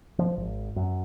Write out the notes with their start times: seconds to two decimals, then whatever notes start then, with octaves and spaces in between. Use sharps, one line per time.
0.19 F3
0.37 G#1
0.76 F#2